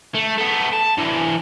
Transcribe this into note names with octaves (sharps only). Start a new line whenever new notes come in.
A3
A3 B3
A5
E3 D4